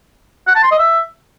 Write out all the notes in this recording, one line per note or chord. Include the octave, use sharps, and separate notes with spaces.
F#5
A5
C6
D#5
E5